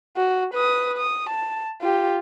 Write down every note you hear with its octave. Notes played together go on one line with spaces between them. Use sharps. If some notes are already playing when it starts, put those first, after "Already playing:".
F#4
B4 D#6
D#6
A5
F4 G4